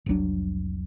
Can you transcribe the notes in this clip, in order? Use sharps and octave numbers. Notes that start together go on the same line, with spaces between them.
F1 C2 F#3 D4